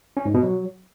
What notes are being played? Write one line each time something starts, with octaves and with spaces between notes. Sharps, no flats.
C#4
G#2
B2
F#3